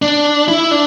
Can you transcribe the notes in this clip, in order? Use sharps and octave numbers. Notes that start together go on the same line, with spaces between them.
D4
E4
D4